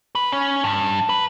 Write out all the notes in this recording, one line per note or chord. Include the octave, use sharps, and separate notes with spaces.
B4
C#4
G2
B4